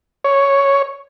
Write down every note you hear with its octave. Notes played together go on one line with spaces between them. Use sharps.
C#5